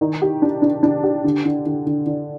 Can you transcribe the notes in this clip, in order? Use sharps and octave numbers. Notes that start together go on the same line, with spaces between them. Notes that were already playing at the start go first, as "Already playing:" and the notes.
D#3
G4
D4
D4
D4
G4
D3
D3
D3
D3
D3